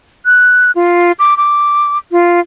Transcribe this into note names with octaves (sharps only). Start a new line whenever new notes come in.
F#6
F4
D6
D6
F4